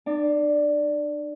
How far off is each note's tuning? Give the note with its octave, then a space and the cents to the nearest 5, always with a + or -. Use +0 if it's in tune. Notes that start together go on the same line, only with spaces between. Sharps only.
D4 +40 D5 +0